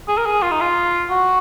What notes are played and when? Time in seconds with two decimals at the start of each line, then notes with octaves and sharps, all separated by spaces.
0.08 G#4
0.18 A#4
0.26 G#4
0.42 F4
0.51 D#4
0.61 F4
1.10 F#4